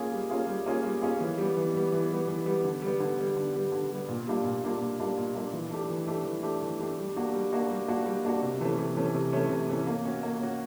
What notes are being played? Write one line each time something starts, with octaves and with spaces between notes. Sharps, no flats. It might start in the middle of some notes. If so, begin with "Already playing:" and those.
Already playing: A#3 C#4 F4 G#4
G3
A#3 C#4 F4 G#4
G3
A#3 C#4 F4 G#4
G3
A#3 C#4 F4 G#4
E3
G3 B3
E3
G3 B3
E3
G3 B3
E3
G3 B3
D3
G3 B3
D3
G3 B3
D3
G3 B3
D3
G3 B3
A#2
G3 A#3 D4 F4
A#2
G3 A#3 D4 F4
A#2
G3 A#3 D4 F4
A#2
G3 A#3 D4 F4
E3
A3 D4 G4
E3
A3 D4 G4
E3
A3 D4 G4
E3
A3 D4 G4
G3
A#3 D4 F#4
G3
A#3 D4 F#4
G3
A#3 D4 F#4
G3
A#3 D4 F#4
C3
E3 A3 C#4
C3
E3 A3 C#4
C3
E3 A3 C#4
C3
E3 A3 C#4
A#3
C#4 F#4
A#3
C#4 F#4